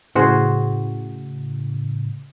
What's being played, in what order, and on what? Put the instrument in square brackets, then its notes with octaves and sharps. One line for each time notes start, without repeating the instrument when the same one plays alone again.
[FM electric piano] A2 C#3 [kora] F#4 G#4 C5